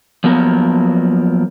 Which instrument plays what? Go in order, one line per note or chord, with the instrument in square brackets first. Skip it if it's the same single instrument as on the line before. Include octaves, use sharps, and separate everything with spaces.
[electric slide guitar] F3 F#3 A#3 B3 A#4